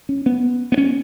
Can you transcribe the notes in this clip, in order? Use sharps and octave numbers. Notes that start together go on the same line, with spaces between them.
C#4
B3
B3
C#4